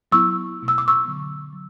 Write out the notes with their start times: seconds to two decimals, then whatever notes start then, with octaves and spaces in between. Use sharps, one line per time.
0.12 F#3 B3 E4 C#6 E6
0.58 B2 A3 E4
0.68 E6
0.78 D6
0.88 C#6 E6
1.05 D3 F#3 B3
1.53 F#3